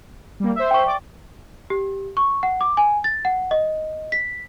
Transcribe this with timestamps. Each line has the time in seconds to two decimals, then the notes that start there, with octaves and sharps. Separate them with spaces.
0.40 G3 A#3
0.55 C5 E5
0.71 G5 C#6
0.86 D5 D6
1.70 G4
2.17 C#6
2.43 F#5
2.61 D6
2.77 G#5
3.04 A6
3.25 F#5
3.51 D#5
4.12 B6